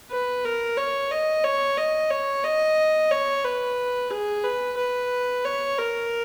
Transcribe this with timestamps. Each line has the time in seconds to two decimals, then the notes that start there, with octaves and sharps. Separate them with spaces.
0.11 B4
0.45 A#4
0.78 C#5
1.11 D#5
1.44 C#5
1.77 D#5
2.10 C#5
2.44 D#5
3.11 C#5
3.44 B4
4.10 G#4
4.44 B4
4.77 B4
5.45 C#5
5.78 A#4